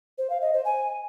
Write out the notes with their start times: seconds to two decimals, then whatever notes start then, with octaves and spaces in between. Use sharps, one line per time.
0.18 C5
0.30 F5
0.42 D#5
0.53 C5
0.65 G#5